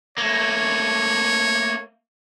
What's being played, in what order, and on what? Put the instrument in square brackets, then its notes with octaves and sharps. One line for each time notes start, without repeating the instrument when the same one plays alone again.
[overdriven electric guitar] A3 A#3 [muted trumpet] C#5